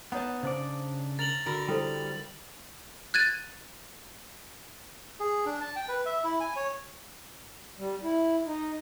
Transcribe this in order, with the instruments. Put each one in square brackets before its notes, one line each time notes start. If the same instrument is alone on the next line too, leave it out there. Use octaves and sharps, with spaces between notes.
[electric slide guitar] B3 [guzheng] D#4 A5 [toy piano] C#5 F#5
[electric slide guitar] C#3 D4 D5 [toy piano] C5
[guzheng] A#4 [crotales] A6 F7 F#7
[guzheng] D3 A#4 [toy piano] D#4 F#4 B5
[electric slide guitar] G3 [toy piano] E4 A4 C5
[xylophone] F#6 G#6 A6 D#7
[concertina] G#4
D4
A5
G5
B4
E5
E4
G#5
C#5
[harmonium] G3
E4
D#4